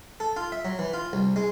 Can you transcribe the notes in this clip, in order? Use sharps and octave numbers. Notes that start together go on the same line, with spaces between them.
A4
F4
E5
F#3
E3
F4
C2
G#3